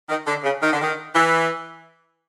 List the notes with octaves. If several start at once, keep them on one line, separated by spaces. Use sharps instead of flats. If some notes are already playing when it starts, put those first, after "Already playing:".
D#3
D3
C#3
D#3
D3
D#3
E3